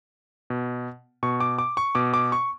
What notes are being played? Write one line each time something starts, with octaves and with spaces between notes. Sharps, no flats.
B2
B2 C#6
D6
D6
C#6
B2 D6
D6
C#6